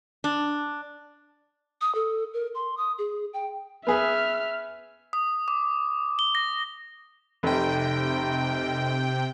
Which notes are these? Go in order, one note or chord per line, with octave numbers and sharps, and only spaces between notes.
D4
D#6
A4
A#4
C6
D#6
G#4
G5
B3 G#4 B4 E5 F6
D#6
D6
G7
A#6
F1 C3 G5